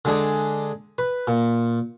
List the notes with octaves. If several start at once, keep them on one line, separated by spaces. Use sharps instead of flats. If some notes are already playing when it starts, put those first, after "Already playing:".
D3 G#3 D4 G#4
B4
A#2